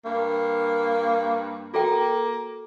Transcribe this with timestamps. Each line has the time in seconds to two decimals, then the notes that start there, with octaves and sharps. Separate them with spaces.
0.05 G2 A#3
1.74 A#3 F#4 A4 G5